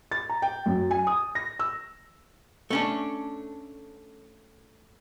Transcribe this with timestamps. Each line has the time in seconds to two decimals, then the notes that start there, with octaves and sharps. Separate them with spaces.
0.11 A6
0.29 A#5
0.42 G5
0.66 F#2
0.91 G#5
1.07 D#6
1.35 A#6
1.59 E6
2.70 A3 C#4 D4